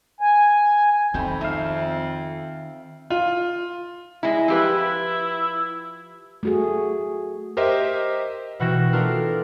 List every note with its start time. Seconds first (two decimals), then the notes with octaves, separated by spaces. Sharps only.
0.21 G#5
1.14 F2 C3 D#3 A3 C4 G5 B5
1.41 C4 D#4 E5 F5 G#5
3.10 F4
4.23 G#3 E4
4.48 F3 E4 G4 B4
6.43 A3 F#4 G#4
7.57 G4 A#4 C5 D#5 E5
8.60 B2 E3 F#4 G5 A#6 E7
8.93 A3 D4 F4 A#4